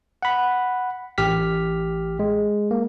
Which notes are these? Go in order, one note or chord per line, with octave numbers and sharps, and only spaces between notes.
F#5 B5
A1 G4 F6 B6
G#3
A#3